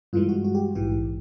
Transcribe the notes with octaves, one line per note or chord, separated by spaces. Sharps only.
G2 E3 G#3 F4
F#4
F#4
G4
A#1 G#2 E3 G4